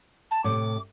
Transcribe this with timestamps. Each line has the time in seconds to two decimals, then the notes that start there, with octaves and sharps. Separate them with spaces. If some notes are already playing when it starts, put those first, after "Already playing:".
0.31 A5
0.44 A2 C3 D6